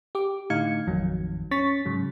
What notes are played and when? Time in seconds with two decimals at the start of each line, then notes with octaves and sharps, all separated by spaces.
0.15 G4 D6
0.50 A2 D3 D#4 F5 G#6 C#7
0.87 A1 F2 D#3 F#3
1.51 C#4 C#6 A6 B6
1.85 G#2 C#3 F#3